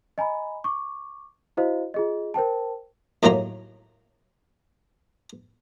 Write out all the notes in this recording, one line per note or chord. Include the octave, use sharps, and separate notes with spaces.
D#5 G#5 A#5 B5
C#6 D6
E4 F#4 C5 D#5 F5
F4 G#4 D#5
A#4 C5 G5 A5
D#2 A2 F#3 A#3 D#4 A#5